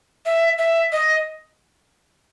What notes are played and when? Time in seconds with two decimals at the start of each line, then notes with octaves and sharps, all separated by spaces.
0.26 E5
0.58 E5
0.92 D#5